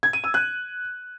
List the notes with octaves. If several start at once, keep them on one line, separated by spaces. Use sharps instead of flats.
G#6
D#7
E6
F#6